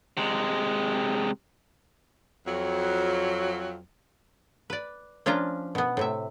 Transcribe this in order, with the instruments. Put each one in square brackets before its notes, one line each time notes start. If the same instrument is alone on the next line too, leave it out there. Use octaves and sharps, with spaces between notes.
[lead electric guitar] C3 G#3
[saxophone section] F2 F#3
[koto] B4 D5
F3 C#4 D4 F4 A#5
B2 B3
A2 C3 E5